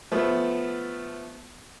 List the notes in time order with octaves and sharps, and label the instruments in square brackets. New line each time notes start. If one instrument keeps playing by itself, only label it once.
[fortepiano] F3 A3 B3